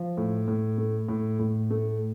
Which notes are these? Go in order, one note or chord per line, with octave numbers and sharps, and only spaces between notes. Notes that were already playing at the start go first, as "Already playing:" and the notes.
Already playing: F3
A2
A2
A3
A2
A2
A3